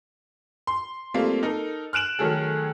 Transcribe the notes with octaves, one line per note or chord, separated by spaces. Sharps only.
C6
G3 A3 A#3 C4 F4
D#4 A4 A#4
F6 F#6 D7 E7 F#7
D#3 F#3 A3 G#4 A4